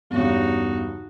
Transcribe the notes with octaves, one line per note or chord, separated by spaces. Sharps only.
E2 G2 C#3 D#4 F#4